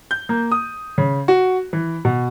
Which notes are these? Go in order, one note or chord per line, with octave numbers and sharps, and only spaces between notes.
G6
A#3
D#6
C#3
F#4
E3
B2